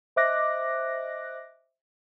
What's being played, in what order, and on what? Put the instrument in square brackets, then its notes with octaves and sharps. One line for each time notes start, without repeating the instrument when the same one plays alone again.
[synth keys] C5 D#5 E5 D6 F#6 A#6